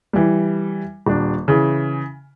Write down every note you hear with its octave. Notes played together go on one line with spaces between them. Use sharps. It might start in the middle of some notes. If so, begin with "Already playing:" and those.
E3 G3
D#1 D4
C#3 E3